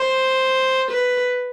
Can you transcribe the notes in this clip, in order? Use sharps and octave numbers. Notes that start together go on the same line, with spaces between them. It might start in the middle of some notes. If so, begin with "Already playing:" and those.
Already playing: C5
B4